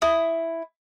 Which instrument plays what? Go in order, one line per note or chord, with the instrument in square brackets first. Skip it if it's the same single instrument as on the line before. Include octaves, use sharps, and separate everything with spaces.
[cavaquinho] E4 D#6